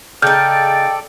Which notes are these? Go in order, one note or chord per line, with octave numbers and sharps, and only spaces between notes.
C#3 D#4 A4 D5 G5 F6 G6